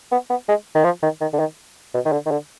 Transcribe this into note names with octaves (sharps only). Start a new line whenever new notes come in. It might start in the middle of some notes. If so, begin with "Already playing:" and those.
B3
B3
G#3
D#3
F3
D#3
D#3
D3
D#3
B2
D#3
D3
D#3
D3